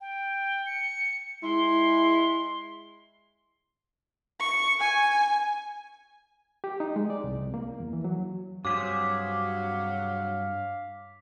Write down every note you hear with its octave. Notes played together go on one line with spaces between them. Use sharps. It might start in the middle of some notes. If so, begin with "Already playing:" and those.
G5
C#7
G#3 E4 C6
C#6
G#5
G4
D#4
G#3
D5
C2
C2
A#3
E2
E3
F#3
G2 C3 F#3 G#4 C5 F5 D6 B6